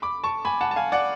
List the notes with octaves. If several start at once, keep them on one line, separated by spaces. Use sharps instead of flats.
B5 D6
A5 C#6
G#5 B5
F#5 A5
A5
F5 G#5
D5 F#5